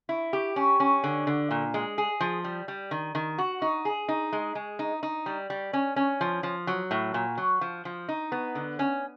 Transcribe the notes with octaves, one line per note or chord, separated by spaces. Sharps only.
E4
G4
C#4
C#4
D3
D3
A#2
G#3
G#4
F3
G3
G3
D#3
D#3
F#4
D#4
G#4
D#4
G#3
G#3
D#4
D#4
G3
G3
C#4
C#4
F3
F3
F#3
A2
A#2
F#3
F3
F3
D#4
B3
D3
C#4